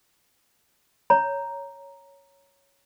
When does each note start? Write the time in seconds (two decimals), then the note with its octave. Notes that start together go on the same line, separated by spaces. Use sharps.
1.10 C#5 A#5